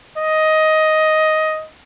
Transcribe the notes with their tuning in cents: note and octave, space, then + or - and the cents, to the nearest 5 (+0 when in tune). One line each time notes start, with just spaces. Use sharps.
D#5 +10